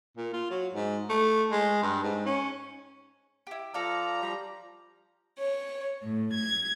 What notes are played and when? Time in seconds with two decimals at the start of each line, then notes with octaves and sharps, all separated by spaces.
0.17 A#2
0.33 F4
0.50 F#3
0.74 G#2
1.09 A3
1.51 G#3
1.82 G2
2.03 G#2
2.26 C#4
3.47 E4 G4
3.74 F3 A4 D5 F5 A#5
4.22 G3
5.38 C#5
6.02 A2
6.35 G#6